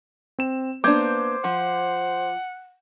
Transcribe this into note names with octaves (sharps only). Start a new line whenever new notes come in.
C4 E7
A#3 B3 D4 C5 D6 G6 G#6
F3 F#5